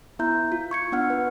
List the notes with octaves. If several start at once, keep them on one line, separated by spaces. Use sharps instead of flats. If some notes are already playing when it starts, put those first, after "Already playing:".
B3 E4 E5 A#5 G6
F4
C#6 G#6 C#7
B3 D4 F#5 F6
B4